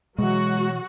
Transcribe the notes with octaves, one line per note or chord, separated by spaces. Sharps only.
B2 E3 F#3 G#3 F#4